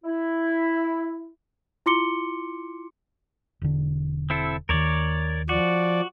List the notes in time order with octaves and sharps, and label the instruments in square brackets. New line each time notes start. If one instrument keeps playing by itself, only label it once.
[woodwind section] E4
[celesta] E4 F4 C6 D6 C#7 G7
[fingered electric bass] E1 D3
[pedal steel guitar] C4 E4 A4
[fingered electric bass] D#2 D#3 [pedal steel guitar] A#4 C#5 D5
[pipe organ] F3 D5 [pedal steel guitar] F#4